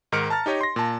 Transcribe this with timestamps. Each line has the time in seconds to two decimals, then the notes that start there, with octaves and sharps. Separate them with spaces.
0.12 G#2 D#3 A#4 F6 C#7 D7
0.30 A5 A#5 F6 A6
0.46 D#4 G4 C#5 D#5
0.61 C6 A#6
0.76 A#2 A5